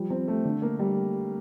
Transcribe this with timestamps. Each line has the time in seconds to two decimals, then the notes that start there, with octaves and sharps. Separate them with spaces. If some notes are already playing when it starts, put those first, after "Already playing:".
Already playing: F3 G3
0.10 C4
0.28 A3
0.45 D3
0.62 A#3
0.79 G3